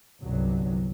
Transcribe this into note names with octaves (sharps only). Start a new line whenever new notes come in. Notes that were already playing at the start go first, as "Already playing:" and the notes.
G1 C2 F#3